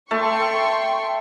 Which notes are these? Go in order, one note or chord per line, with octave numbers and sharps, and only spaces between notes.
A3 G5 A5 C6 C#6